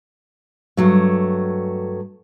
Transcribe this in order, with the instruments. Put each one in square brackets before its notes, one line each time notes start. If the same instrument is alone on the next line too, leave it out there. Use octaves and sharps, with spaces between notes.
[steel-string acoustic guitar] G2 F#3 A3